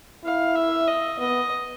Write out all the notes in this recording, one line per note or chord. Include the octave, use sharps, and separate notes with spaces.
E4 F5
E5
D#5
B3 D#5